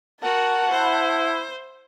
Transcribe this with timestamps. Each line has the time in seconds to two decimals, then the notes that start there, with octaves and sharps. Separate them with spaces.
0.21 F#4 A#4 F#5 A5
0.70 E4 C5